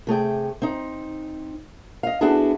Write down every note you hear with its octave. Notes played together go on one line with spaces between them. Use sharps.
C3 A3 G#4 G5
C4 D#4
D#5 F5
B3 D4 E4 F#4 G#4 A4